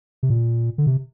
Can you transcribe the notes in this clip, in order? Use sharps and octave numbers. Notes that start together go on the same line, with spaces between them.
C3
A#2
D3
C3